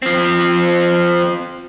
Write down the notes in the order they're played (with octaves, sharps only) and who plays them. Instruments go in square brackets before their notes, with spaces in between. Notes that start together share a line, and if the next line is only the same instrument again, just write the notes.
[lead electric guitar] F3 C4